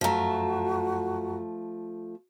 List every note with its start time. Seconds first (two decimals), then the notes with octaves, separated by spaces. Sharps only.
0.01 F#2 F3 A3 F#4 A#5